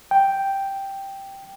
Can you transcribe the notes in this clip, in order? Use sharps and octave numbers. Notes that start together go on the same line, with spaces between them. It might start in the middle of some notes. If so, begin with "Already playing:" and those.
G5